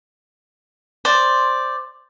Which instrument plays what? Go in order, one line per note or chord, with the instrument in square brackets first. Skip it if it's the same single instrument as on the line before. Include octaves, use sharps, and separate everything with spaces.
[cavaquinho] C5 D5